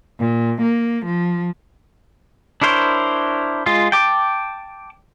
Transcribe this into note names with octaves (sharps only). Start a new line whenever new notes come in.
A#2
A#3
F3
D4 E4 A#4 C5 C#5
G#3 F4
G5 A5 D6